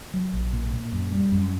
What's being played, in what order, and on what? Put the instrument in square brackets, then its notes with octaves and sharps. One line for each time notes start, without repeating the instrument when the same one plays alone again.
[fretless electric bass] F#3
A#1
A#2
A#2
F#2
G3
F#2